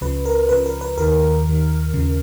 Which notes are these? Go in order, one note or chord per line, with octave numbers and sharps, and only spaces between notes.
C#2 C#3 F3 B4
A#4
C#2 C#3 F3 B4
A#4
B4
D#2 D#3 A#4
D#2 D#3
D#2 C#3 F3